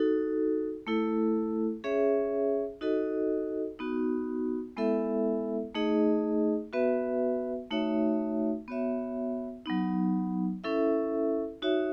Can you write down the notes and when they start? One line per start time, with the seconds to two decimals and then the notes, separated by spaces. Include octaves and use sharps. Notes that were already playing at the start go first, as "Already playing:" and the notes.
Already playing: D#4 F#4 A4
0.87 A3 E4 A4
1.84 C#4 G#4 C#5 E5
2.81 D#4 F#4 A4 D#5
3.79 B3 D#4 F#4
4.77 G#3 B3 E4 A4 E5
5.74 A3 D#4 G#4 D#5
6.73 B3 F#4 B4 E5
7.71 A3 D#4 F#4 C#5 E5
8.68 B3 F#4 C#5 E5
9.66 F#3 B3 D#4
10.64 C#4 E4 A4 E5
11.62 D#4 F#4 C#5 E5